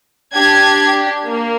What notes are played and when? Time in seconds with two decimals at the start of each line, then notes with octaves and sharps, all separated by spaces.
0.36 D4 G4 G#6
1.27 A#3